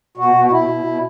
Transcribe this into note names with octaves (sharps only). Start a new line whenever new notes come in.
B2 F#4
B2
F#4
B2 E4
B2
B2